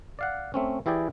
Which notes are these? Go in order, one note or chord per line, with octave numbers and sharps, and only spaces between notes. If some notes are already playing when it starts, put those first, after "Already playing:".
D5 F5 F#5
A3 C4 C#4
E3 E4 G4 G#4 D5 G5